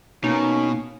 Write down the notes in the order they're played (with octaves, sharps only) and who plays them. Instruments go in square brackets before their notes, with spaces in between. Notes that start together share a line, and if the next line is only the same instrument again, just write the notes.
[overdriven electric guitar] B2 [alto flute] A#3 [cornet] C#4 [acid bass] D#4